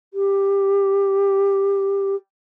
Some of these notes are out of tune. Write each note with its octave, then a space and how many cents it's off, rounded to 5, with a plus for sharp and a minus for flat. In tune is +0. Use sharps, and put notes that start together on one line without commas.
G4 +10